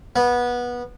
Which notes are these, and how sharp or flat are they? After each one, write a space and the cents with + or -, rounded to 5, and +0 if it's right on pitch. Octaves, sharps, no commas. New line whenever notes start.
B3 -20